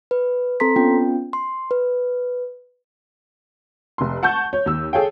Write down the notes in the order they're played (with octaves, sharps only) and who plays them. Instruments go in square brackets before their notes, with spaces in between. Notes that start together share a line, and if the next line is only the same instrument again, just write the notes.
[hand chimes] B4
C4 A4 A#5 C6 B6
B3 C#4 F4 G5
C6
B4
[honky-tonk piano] F1 C6
F#5 A5 C#6 G6
C#5
D#2 E6
G#4 A4 C#5 F5 G5